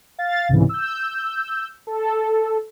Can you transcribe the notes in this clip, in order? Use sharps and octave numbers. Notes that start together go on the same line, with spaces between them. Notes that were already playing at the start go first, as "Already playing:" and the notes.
F5 A6
C2 G#2 C#3 E3
E6 G6
A4